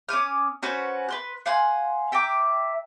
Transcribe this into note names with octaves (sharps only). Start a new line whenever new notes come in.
C#4 D6 D#6 F6
C#4 F#4 B4 C5
B4 C6 F#6
F5 F#5 G#5 C6
E5 G5 A#5 D6